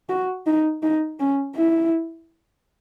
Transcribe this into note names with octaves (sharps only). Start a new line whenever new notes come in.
F#4
D#4
D#4
C#4
E4